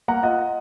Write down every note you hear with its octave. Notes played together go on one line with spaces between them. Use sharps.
A#3 F#5 A#5
F4 D#5 F#5